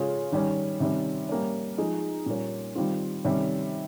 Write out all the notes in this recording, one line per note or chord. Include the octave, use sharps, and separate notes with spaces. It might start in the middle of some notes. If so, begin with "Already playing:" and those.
Already playing: C#3 G#3 C#4 F4
D#3 G3 C#4
C3 D#3 G3 C#4
G3 A#3 C#4
F3 G#3 D#4
A#2 G3 A#3 C#4
D#3 G3 C4 F4
C3 D#3 G3 C#4